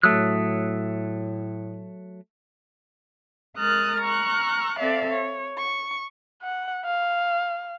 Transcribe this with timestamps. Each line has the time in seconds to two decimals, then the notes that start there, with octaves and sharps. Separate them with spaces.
0.03 A2 F#3 A3 D#6 E6 F#6
3.56 G#3 A#4 D#6 F6 F#6 A6
4.01 A#5 C#6 F6 F#6
4.79 C4 A4 D5 E5 F5
5.10 C#5
5.57 C#6
6.43 F#5
6.85 F5